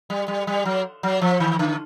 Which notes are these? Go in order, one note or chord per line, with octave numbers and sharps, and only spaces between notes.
G3
G3
G3
F#3
F#3
F3
D#3
D3